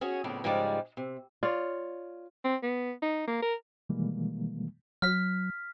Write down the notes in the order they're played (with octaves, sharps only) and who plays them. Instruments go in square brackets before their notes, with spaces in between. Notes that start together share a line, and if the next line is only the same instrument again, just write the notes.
[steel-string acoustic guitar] C#4 F#4 G#4 C#5
F2 A2 C#3 B3 D4
G#2 C#3 F3 G3 G#3 D5
C3
[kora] F4 C#5 [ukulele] D5
[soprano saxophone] C4
B3
D#4
A#3
A#4
[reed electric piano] B2 D#3 E3 G3 G#3 A#3
[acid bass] F#3 [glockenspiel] F6 B6